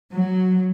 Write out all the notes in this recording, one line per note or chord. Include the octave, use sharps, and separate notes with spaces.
F#3